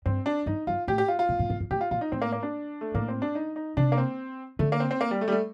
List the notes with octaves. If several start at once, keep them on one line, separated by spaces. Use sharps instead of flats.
G2 C4
D4
G2 D#4
G2 F4
A2 G4
G4
F4
F4
A#2
A#2
A2
G2
A2 G4
F4
A#2 F4
D#4
A2 C4
A#3
A#3
D4
A3
A2 A#3
C4
D4
D#4
D#4
C3 D4
A#3
C4
D3 A3
A#3
C4
C4
A#3
G3
A3
G3
A3